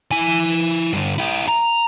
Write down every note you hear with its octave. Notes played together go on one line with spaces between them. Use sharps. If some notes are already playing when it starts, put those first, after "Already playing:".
E4 G#5
G2 D3
E4 G4
A#5